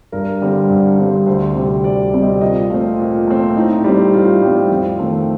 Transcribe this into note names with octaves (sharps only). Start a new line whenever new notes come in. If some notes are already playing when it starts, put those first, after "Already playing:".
G2 A#4
D3 G3 C4
G2
D3 G3 C4
D2 C5
C3 G3 C4
D2 D5
C3 G3 C4
D#5
A#2 D#5
A3 C4 F4
A#2
A3 C4
A2 D#4
G3 C4
A2 F4
G3 C4
F2
D#3 A3 C4